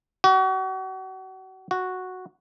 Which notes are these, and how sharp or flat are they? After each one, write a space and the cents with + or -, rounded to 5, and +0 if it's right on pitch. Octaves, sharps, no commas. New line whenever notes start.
F#4 +35
F#4 -5